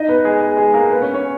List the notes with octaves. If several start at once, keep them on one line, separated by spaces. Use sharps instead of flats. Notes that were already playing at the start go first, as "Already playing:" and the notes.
Already playing: D#4 D#5
B3 B4
G#3 G#4
G#3 G#4
G#3 G#4
A#3 A#4
B3 B4
C#4 C#5
C#4 C#5